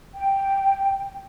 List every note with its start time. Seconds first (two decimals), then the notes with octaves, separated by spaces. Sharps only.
0.15 G5